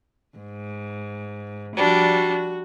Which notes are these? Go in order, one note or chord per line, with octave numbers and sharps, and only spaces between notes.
G#2
F3 G3 D4 F#4